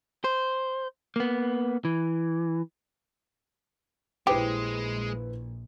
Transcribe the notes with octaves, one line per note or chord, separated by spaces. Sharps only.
C5
A#3 B3
E3
A#1 G#3 E4 G4 B4 C5